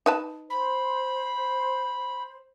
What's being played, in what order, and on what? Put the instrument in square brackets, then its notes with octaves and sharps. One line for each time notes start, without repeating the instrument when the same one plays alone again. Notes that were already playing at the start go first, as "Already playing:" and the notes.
[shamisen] D#4 B4 A5
[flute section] C5 [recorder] B5